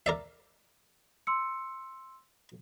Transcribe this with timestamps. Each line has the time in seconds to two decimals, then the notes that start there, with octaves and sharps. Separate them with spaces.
0.06 A#4 D5 E5
1.27 C6 E6 C#7